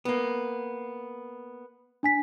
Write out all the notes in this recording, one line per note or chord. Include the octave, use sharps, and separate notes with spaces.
A#3 B3
D4 G#5 B6